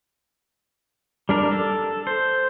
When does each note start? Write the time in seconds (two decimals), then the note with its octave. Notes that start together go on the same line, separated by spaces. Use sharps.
1.29 G3 D4 A#4
1.51 A4
2.07 C5